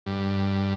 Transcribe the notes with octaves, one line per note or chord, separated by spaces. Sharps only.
G2